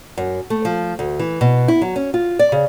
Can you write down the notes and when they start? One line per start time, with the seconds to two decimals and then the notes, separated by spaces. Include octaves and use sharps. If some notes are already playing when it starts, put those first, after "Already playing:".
0.18 F#2
0.50 A3
0.65 F3
0.99 D2
1.19 E3
1.41 B2
1.68 E4
1.82 F#3
1.96 C#4
2.14 F4
2.39 D5
2.52 C#3